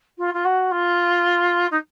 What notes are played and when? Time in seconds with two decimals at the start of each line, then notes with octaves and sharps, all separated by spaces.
0.17 F4
0.33 F4
0.44 F#4
0.71 F4
1.71 D#4